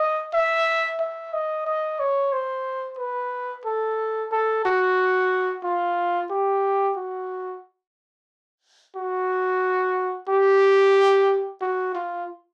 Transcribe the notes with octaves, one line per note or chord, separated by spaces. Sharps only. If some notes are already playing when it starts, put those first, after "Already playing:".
Already playing: D#5
E5
E5
D#5
D#5
C#5
C5
B4
A4
A4
F#4
F4
G4
F#4
F#4
G4
F#4
F4